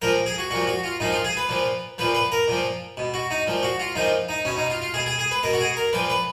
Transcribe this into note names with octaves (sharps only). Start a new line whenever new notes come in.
A#2 F3 A#4
G#4
F#4
A#2 F3 F#4
F#4
F4
A#2 F3 D#4
F4
G#4
B4
A#2 F3
A#2 F3 B4
B4
A#4
A#2 F3
B2
F#4
D#4
A#2 F3
F#4
F4
A#2 F3 D#4
D#4
B2 C#4
D#4
F4
F4
B2 G#4
G#4
G#4
B4
B2 A#4
F#4
G#4
A#4
A#2 F3 B4
B4